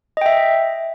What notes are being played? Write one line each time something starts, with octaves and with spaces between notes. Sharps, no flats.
D#5 E5 G5